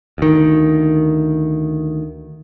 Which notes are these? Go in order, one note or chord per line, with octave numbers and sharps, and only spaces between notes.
D2 D#3